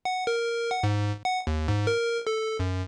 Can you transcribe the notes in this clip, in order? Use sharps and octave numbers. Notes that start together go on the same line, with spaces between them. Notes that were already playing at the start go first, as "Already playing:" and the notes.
F#5
A#4
F#5
G#2
F#5
D#2
G#2
A#4
A4
F#2